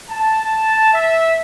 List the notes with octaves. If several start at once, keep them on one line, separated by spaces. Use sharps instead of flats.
A5
E5